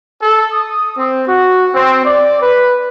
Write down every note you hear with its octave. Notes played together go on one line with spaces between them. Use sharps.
A4
D#6
C4
F#4
C4
D5
B4